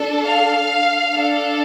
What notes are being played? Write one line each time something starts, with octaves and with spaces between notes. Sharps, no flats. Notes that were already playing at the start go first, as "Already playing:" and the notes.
Already playing: D4 A4
F5
D4 A4